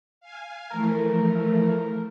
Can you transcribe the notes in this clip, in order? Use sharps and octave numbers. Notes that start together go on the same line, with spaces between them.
F5 G#5
E3 F3 A3 A#4